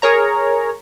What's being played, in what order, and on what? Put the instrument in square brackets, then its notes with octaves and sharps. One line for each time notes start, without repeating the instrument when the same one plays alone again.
[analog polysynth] G#4 A#4 C#5 A#5